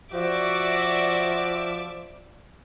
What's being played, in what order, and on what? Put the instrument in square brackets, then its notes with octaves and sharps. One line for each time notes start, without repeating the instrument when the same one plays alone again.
[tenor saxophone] F3 [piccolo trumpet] F#4 [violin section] D5 E5 D6